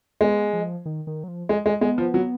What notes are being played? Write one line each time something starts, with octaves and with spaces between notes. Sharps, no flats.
G#3 B3
F3
D#3
D#3
F#3
F3
G#3
G#3
G#3 B3
F3
F#3